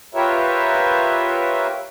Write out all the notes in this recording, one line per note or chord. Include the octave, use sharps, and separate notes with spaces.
F4 G4 A#4 B4 C#5 E5